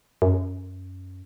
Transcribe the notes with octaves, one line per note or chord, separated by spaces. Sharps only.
F#2